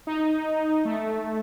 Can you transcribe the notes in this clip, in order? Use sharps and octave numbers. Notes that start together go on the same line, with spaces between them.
D#4
A3